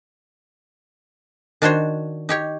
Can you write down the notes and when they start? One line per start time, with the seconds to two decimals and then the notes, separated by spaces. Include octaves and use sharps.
1.62 D#3 D4 F#4 C5 C#5
2.29 D#4 G4 C#5